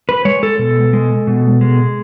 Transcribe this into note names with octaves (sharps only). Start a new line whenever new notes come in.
B4
G#3 C#5
A4
B2
G#3
B2
G#3